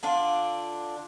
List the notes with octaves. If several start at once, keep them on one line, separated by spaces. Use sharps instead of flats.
D3 D4 F4 F5